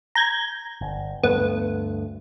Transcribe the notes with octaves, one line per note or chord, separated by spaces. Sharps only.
A#5 G6 G#6
G1
D2 G2 A3 B3